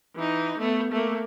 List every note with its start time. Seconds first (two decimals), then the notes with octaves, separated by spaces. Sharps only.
0.15 E3 D#4
0.59 A3 B3
0.92 A3 A#3